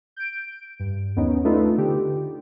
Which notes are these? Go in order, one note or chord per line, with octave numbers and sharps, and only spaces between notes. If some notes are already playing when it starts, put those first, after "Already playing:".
G6 D7
G2
D#2 B3 C#4 D#4
A3 D4 D#4 F4 A4 B4
D3 G4